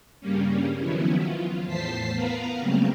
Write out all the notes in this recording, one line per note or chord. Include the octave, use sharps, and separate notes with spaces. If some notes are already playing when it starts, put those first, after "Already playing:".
G2 C#3 G3 A#3 C#4
D#3 F3 F#3 B3 C#4 E4
F4
E2 A2 C5 A5 B6 C7
B3 A#4 B4 F5 A#5
C#3 F#3 G3 A3 A#3 C4